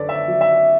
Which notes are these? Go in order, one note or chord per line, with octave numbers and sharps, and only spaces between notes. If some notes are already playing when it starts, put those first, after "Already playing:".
Already playing: F#2 D3 A4 B4 C#5 D5
E5
D5
F#3
E5